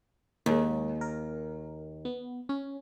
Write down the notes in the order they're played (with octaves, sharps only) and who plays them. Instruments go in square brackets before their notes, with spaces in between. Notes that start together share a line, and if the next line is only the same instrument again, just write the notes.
[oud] D#2 [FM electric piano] G#3 A#3
[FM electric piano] A#4
B3
C#4